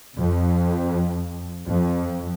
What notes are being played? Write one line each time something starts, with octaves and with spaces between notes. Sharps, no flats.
F2
F2